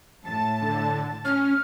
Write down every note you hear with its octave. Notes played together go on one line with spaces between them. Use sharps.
A2 A5 A6
D3
C#4 F6